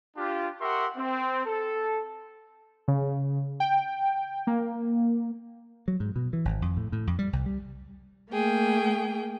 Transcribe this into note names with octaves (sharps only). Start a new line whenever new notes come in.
D4 F4 G4
G4 A#4 E5 F#5 C6 C#6
C4
A4
C#3
G5
A#3
F#3
G#2
B2
E3
G#1
F2
A2
A2
F2
G3
C2
G3
A3 A#3 G#4 G5